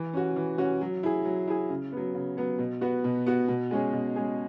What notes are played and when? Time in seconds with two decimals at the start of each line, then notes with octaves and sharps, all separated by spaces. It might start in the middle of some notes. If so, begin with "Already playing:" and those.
Already playing: E3
0.13 C#4 F#4
0.36 E3
0.58 C#4 F#4
0.81 F#3
1.03 E4 G#4
1.25 F#3
1.48 E4 G#4
1.70 C#3
1.92 F#3 B3
2.14 C#3
2.37 F#3 B3
2.59 B2
2.81 B3 F#4
3.04 B2
3.26 B3 F#4
3.48 B2
3.71 G#3 C#4 G#4
3.93 B2
4.16 G#3 C#4 G#4